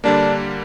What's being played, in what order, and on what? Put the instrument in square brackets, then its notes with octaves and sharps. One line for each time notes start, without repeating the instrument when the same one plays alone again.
[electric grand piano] D3 G3 A#3 [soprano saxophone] D4